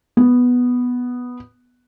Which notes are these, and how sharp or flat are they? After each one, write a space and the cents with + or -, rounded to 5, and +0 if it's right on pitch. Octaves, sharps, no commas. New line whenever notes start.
B3 +0